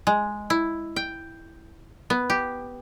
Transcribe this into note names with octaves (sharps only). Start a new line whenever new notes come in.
G#3
E4
G5
B3
G4